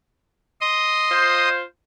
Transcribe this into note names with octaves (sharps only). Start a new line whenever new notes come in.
D#5 C6 D#6
F4 C5